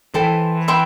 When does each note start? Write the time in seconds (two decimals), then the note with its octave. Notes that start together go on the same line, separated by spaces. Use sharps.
0.14 E3 A4 C5 G5
0.68 B4 E5 G5 C6